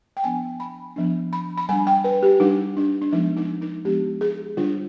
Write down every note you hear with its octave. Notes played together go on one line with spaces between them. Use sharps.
G5
F3 B3 D4 G#5
B5
F3 B3 D4
B5
B5
G3 D4 G#5
G5
B4
G4
G3 D4 D#4
D4
D4
F3 G#3 B3 D4 D#4
D#4
D#4
F3 G#3 B3 D4 G4
G#4
D3 G3 D4 F4